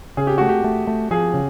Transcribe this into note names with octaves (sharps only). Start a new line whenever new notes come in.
C#3 G#4
G4
A3 F#4
G4
A3
A3
F3 G#4
C#3